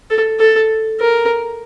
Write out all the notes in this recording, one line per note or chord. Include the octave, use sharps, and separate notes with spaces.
A4
A4
A#4